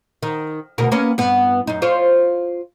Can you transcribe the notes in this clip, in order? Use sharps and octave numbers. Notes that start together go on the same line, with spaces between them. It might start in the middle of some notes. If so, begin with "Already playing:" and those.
D#3
D2 B2 A#4
A#3 B3 C#4
G2 B3
F#2 D#4
F4 C5 C#5